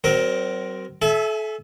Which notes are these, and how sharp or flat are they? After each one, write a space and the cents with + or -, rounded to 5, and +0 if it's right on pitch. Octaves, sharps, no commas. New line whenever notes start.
F#3 +45 C4 +0 A#4 +10
A4 -30 E5 +0 G#5 +25